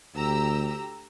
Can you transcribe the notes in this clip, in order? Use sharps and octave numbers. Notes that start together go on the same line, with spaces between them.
D2 G4 A#5 E6